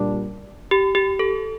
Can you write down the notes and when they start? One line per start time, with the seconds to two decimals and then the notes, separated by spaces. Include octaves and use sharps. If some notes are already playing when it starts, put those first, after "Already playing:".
Already playing: A#2 G3 D4
0.71 G4
0.95 G4
1.19 A4